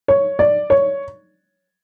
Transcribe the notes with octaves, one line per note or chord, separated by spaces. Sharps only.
C#5
D5
C#5